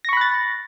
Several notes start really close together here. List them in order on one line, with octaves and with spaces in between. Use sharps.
A#6 C#6 B5 F#6 A6